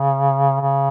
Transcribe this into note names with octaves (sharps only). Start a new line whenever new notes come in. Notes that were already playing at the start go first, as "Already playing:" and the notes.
Already playing: C#3
C#3